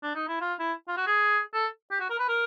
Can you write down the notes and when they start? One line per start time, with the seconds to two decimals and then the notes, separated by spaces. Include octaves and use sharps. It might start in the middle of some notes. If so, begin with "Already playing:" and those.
0.03 D4
0.15 D#4
0.28 E4
0.41 F4
0.59 E4
0.88 F4
0.97 F#4
1.07 G#4
1.54 A4
1.91 G4
2.00 F#4
2.10 A#4
2.19 B4
2.29 A#4